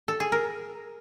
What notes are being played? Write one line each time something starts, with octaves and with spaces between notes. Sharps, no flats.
A4
G#4
A#4